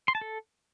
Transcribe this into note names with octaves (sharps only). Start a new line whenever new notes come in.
C6
A5
A4